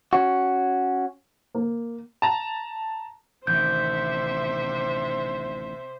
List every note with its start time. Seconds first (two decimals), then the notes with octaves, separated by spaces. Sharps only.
0.13 C#4 F#4
1.55 A#3
2.22 A5 A#5
3.47 A1 D2 C3 D#3 C5 E5 G6